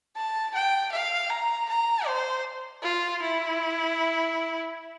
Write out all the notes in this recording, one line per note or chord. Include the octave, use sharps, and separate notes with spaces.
A5
G5
F5
A#5
A#5
C5
F4
E4